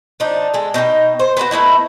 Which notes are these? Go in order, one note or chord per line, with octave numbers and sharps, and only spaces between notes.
F3 D4 D#4
G#3 A4
B2 D#4 D#5 G5
C5
B3 C4 E4 F#4
A3 B3 D#4 E4